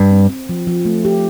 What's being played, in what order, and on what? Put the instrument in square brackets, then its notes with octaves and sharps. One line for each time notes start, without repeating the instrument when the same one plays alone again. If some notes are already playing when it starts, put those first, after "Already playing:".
Already playing: [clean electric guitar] G2
[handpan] C4
C4
F3
F3
A3
G4